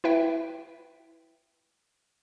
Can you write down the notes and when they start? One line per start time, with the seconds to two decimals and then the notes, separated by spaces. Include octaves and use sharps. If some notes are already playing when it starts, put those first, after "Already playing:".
0.04 E4 B4 E5 G5